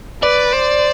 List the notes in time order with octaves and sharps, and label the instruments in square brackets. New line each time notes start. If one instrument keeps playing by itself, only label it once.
[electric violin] B4 [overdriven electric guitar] D5
[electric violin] C5